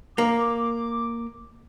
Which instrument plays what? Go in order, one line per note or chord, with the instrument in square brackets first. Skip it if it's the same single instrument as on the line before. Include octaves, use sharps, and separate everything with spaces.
[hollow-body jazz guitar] A#3 [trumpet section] D6